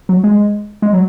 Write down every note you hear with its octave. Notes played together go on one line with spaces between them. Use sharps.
F#3
G#3
G#3
F#3